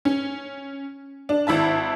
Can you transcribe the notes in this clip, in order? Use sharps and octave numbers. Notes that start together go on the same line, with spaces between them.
C#4
D4
G#1 E4 E5 A5